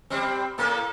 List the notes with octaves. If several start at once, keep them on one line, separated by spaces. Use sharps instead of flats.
G3 C4
A2 A#3 A4